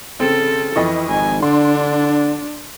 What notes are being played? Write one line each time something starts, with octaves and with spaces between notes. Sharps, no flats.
C#3 C4 A4
F2 E3 D#5 C#6
G#1 G#5
D3 D4 C6